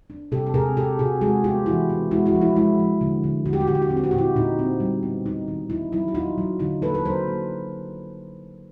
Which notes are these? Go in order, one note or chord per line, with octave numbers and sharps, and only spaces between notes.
D4
C3 G4 A4
A4
C3 G#4 A#4
C3 G4 A4
C3 F#4 G#4
G#3 F#4 G#4
B3 F4 G4
E3 E4 F#4
B3
G#3 E4 F#4
E4 F#4
F3
E4
G#3 E4
F3
D3
D3
D3 F#4
G4
F#4
D3 G4
F#4
G4
C4 F#4
G4
F#4
G4
A#2 E4 F#4
A#2 D#4
C4
G3
B3
D#4
D#3
D#4 E4
F#3 E4
F#4
D#4 F4
F#3
D3 D#4 F4
A#3 A4 B4
B4
F#3 A#4 C5
A#3